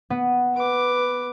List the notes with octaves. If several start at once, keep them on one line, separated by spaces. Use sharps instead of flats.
B3
B4 D6